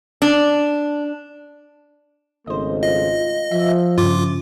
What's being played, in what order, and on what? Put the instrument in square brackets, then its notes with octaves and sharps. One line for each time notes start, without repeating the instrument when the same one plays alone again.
[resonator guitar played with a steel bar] D4
[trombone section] G#1 C#3 A3 [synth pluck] C5 D#5
[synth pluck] F4 [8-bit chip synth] D#5
[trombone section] F3 [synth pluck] E5
[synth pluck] G2 C#3 [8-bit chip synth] F4 D6